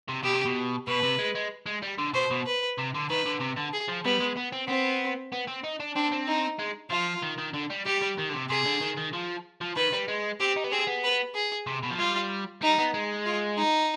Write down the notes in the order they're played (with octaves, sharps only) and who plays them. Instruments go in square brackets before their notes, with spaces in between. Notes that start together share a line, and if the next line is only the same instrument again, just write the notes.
[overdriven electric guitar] C3
[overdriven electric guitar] B2 [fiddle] G4
[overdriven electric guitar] C3
B2
[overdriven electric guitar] B2 [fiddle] B4
[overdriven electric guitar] C3
G#3
G#3
G#3
G3
D3
[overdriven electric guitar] B2 [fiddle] C5
[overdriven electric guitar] B2
[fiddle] B4
[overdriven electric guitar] C3
D3
[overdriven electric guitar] D#3 [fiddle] B4
[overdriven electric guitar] D3
C3
D3
[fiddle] G#4
[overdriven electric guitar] F3
[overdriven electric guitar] G3 [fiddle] B3
[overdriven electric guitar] G#3
B3
C4
[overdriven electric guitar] B3 [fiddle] C4
[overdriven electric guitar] B3
C4
D#4
D4
[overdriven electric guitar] C4 [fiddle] D4
[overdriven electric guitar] C4
[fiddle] D#4
[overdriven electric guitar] G#3
[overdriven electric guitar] F3 [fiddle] F4
[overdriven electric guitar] D#3
D#3
D3
G3
[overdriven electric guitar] G3 [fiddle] G4
[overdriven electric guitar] G3
D#3
D3
C3
[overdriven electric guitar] C3 [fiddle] G#4
[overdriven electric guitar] D3
D#3
D#3
F3
F3
[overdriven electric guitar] D#3 [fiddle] B4
[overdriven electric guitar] G3
G#3
[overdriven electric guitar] C4 [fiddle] G4
[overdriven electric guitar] D#4
B3
[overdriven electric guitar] C4 [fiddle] G#4
[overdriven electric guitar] B3
[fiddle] B4
G#4
[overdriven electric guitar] C3
B2
F3
[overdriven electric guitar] G3 [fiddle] F4
[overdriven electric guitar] G3 [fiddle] D#4
[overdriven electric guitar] B3
G#3
[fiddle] F4
D#4